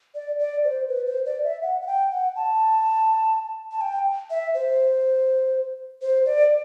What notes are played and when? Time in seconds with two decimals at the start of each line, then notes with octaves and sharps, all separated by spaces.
0.15 D5
0.39 D5
0.64 C5
0.89 B4
1.06 C5
1.26 D5
1.44 E5
1.63 F#5
1.81 F#5
1.87 G5
2.11 F#5
2.36 A5
3.72 A5
3.81 G5
4.30 E5
4.54 C5
6.02 C5
6.26 D5